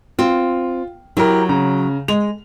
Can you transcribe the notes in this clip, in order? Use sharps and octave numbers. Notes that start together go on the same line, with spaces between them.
C4 F4
F#3 E4 G4 A#4
C#3 A#5
G#3 F7